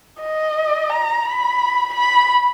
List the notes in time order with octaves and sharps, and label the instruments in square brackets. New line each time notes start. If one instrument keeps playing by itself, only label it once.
[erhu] D#5
A#5
B5
B5